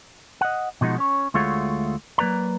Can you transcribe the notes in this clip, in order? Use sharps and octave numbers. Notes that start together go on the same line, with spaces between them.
D#5 F#5
B2 F3 G#3 D#4 F#4
C#4 C#5
D2 G#3 A3 F4 F#4 C#5
F#3 A#3 B4 D5 A#5